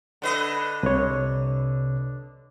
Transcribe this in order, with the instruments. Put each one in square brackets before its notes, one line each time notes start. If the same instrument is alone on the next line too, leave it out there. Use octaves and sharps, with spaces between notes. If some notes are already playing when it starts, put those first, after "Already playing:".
[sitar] D3 B4 D#5
[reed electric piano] C2 C#5 [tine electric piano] C3